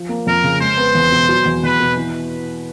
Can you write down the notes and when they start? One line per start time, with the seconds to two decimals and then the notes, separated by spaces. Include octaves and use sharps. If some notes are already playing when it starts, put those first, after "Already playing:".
Already playing: F3
0.09 A#3
0.27 F2 A#4
0.43 C#3
0.60 G#3 C5
0.77 B3
0.95 E2
1.12 B2
1.29 F#3
1.46 E2
1.63 E2 B4
1.80 B2
1.97 E3